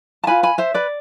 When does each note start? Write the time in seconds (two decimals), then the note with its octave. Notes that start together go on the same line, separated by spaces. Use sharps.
0.24 A5
0.27 F4 B4 G#5 B5
0.43 G#5 B5
0.58 C5 E5
0.74 B4 D5